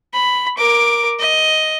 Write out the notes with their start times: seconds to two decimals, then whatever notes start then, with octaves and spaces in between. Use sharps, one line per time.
0.14 B5
0.58 A#4 D6
1.20 D#5